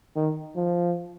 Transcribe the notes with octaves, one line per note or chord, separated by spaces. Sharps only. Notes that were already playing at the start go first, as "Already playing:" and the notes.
D#3
F3